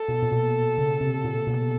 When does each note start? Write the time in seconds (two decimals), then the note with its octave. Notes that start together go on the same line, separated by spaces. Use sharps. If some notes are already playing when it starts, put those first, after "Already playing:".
Already playing: A4
0.08 B2
0.22 A#2
0.32 B2
0.78 C#3
1.01 C3
1.24 A#2
1.47 B2